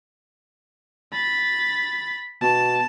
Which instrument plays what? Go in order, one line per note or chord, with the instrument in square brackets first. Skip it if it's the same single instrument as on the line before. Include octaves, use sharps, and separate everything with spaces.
[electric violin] B5 A6
[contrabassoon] B2 [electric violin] A5